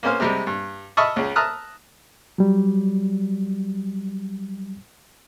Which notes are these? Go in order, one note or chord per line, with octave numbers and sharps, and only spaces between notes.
A#3 B3 C#4 C5 F5
C3 G3 G#3
G2
D#5 E5 A5 B5 C#6 F6
C#2 C#3
E5 A5 A#5 D#6 F6 F#6
F#3 G3